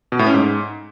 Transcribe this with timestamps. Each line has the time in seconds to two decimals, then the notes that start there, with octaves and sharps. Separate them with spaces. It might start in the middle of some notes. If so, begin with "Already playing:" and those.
0.12 B2
0.19 A2
0.27 C#4
0.34 G#2